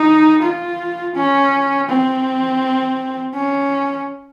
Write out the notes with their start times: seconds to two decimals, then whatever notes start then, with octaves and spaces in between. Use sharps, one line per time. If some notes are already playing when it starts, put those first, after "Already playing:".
Already playing: D#4
0.42 F4
1.15 C#4
1.89 C4
3.34 C#4